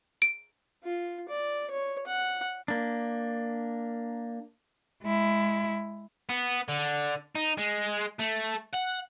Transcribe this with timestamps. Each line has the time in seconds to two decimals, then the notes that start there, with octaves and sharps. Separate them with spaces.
0.22 D7
0.84 F4
1.29 D5
1.71 C#5
2.07 F#5
2.68 A#3 D4
5.02 G#3 E4
6.29 B3
6.69 D3
7.35 D#4
7.58 G#3
8.20 A3
8.74 F#5